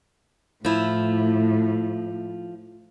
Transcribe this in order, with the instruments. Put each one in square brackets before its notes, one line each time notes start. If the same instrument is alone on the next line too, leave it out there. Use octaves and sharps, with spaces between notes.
[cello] A2 [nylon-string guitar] F3 E4